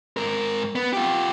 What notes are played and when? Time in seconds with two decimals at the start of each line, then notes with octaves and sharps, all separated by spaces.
0.17 G#2 A#4
0.75 B3
0.93 F4 G4